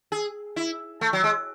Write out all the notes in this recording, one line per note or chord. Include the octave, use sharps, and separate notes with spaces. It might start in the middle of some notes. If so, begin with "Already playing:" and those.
G#4
E4
A3
F#3
G#3